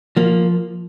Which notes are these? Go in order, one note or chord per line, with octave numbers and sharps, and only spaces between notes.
F3 A#3